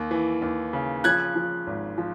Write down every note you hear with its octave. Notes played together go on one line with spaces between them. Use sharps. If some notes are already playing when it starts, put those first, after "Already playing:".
Already playing: D#2
E3
D#2
C#3
F3 F#6 G#6
F3
G#1
F3